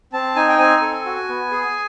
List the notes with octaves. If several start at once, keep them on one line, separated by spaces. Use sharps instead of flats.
C4 A5
D#4 G#5
G5
C4 G#5
A4
F#4
B3
G#4